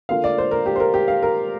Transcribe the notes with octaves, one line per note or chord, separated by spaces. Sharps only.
D3 A#3 F4 F5
D5
C5
A#4
G4
C5
A#4
G4
F5
A#4